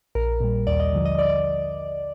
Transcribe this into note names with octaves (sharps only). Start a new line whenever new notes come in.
A#1 A#4
A#2 G3
D#2 D5
D#5
D3 F3
D#5
D5